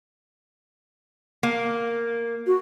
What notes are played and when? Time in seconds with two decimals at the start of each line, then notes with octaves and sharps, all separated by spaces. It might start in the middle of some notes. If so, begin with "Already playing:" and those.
1.43 A#3
2.47 F#4